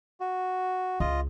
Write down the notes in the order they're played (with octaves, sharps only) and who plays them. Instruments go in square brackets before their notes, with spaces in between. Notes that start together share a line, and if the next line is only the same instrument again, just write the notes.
[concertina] F#4
[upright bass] C#2 [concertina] F4 D#5